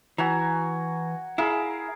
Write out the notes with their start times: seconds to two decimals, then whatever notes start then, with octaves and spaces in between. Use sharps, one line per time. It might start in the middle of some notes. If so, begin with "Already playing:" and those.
0.18 E3 F#4 G#5 A#5
1.38 E4 G#4 A#4 F5